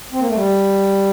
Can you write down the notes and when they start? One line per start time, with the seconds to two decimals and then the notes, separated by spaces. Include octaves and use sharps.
0.13 C4
0.20 A#3
0.28 A3
0.35 G3